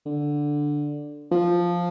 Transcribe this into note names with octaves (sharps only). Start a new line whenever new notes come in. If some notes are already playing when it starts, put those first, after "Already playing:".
D3
F3